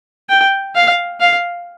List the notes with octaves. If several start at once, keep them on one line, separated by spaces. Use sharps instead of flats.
G5
F5
F5